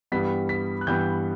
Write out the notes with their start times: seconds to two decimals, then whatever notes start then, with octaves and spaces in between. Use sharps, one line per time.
0.12 G2 E3 G3 B3 B6
0.49 B6
0.81 F#6
0.87 G2 E3 G3 B3 G6